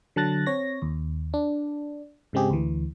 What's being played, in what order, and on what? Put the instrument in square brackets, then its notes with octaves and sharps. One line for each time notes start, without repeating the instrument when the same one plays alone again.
[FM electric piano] D3 F#3 A5 F#6 A6 A#6
C4 C#5 A#6
D#2
D4
G#2 C#3 G#3 C4 G4 G#4
D2 E3